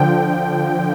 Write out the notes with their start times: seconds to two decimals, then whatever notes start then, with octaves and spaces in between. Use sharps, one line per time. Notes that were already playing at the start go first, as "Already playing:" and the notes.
Already playing: D3 F3 G5